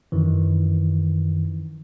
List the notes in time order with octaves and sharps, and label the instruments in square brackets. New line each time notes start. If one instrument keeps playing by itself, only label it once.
[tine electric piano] F#2 D#3 E3